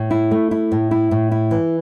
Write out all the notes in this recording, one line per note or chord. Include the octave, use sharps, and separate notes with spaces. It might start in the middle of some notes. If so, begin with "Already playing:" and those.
Already playing: A2
E4
A3
E4
A2
E4
A2
E4
E3